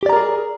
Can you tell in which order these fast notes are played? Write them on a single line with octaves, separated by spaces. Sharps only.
G4 D5 A#5 A#4 G#4